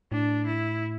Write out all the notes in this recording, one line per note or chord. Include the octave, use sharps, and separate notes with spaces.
A2 D4
E4